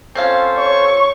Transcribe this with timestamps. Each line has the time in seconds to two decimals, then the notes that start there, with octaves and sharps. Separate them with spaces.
0.15 C4 C#4 F4 A4 C5 F5
0.58 C#5 C#6